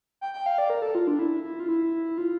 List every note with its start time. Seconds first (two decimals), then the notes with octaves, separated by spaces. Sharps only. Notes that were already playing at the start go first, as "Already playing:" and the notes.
0.21 G5
0.34 G5
0.46 F5
0.58 D5
0.70 A#4
0.82 A4
0.95 F4
1.07 D4
1.19 E4
1.44 E4
1.60 F4
1.68 E4
2.18 F4